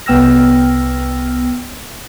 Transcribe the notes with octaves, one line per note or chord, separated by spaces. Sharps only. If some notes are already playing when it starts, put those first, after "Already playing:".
C2 B3 G5 E6 F6 A#6